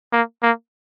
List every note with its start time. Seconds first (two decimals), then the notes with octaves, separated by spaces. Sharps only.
0.13 A#3
0.43 A#3